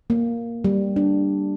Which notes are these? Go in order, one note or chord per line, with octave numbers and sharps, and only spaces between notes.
A#3
G3
D4